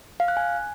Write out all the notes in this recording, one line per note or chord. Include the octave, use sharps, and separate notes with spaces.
F5
F#6
G#5